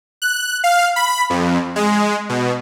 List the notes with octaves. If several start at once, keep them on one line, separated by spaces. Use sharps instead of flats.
F#6
F5
B5
F2
G#3
B2